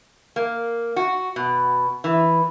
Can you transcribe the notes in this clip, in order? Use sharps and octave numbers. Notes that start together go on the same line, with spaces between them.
A#3
F#4
B2
E3